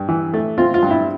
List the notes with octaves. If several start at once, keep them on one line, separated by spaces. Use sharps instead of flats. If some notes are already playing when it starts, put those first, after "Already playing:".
Already playing: G2
E3
A3
C4 F4
F4
G2
E4